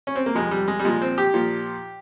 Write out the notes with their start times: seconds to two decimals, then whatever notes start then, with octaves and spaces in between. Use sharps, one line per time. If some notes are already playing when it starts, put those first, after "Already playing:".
0.07 C#4
0.16 C4
0.26 A#3
0.35 F2 C3 F3 G#3
0.51 G3
0.68 G#3
0.79 G3
0.85 A#2 F3 G#3
1.02 C4
1.18 G4
1.34 A#2 F3